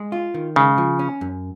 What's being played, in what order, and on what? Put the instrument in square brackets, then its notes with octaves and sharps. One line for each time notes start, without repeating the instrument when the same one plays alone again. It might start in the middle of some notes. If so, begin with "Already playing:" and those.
Already playing: [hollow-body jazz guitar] G#3
F4
D#3
[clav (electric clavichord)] C#3 [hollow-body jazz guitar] G#3
[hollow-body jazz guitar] F3
C#4
F#2